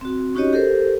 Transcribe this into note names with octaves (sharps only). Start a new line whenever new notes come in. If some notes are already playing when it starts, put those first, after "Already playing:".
C4 F#4
C#4 D#4 F#4 G4 C#5 D#5
G4 A4 A#4 C5